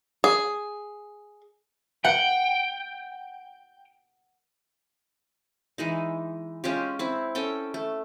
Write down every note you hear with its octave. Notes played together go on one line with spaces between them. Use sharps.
G#4
F#5 G5
E3 G#3 D#4
G#3 C#4 F4 G4
C4 E4
C#4 A4 G5
A3